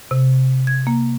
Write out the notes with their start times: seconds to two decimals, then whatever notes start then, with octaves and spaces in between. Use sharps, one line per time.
0.11 C3
0.67 G#6
0.87 A#3